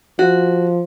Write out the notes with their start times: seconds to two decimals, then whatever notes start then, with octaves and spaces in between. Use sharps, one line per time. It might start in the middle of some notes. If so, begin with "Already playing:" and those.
0.19 F3 F#4